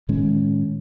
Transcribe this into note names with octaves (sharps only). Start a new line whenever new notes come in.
A2 D#3 G#3 C#4